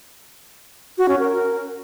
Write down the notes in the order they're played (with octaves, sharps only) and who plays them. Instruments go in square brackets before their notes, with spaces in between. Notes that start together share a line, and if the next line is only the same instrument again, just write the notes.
[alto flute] F#4
C#4
A#4